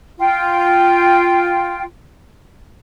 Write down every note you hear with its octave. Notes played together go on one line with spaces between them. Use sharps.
F4 G5